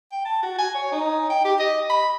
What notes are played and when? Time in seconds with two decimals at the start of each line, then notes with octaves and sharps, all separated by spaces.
0.12 G5
0.25 A5
0.43 F#4
0.59 G#5
0.75 C#5
0.92 D#4
1.30 G5
1.45 G4
1.59 D#5
1.90 B5